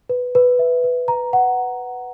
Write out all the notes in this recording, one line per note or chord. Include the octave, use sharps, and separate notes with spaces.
B4
B4
E5
B4
A#5
F#5